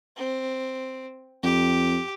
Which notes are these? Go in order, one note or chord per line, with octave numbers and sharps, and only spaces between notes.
C4
F2 G4